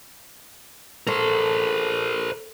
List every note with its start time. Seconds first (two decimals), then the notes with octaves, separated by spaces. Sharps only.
1.07 A4 A#4 C5